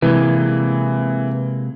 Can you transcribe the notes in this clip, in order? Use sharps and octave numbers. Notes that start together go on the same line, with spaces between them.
C3 E3 G#3 A#3